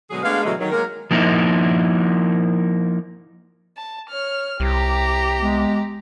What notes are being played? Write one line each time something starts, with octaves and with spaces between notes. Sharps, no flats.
B2 D3 F#3 G#3 G#4
G#3 A3 B3 D4 F5
B2 D3 E3 F#3 G#3 A3
D#3 F#3
F#3 G#3 A#3 A#4
F3 A#3 D#4 E4
A5
C#5 F6
C2 G4 A#5
G#3 B3